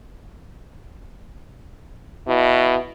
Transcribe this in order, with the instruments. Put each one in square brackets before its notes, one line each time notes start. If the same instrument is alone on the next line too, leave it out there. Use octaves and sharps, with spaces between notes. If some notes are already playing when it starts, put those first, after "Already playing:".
[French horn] B2 [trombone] E4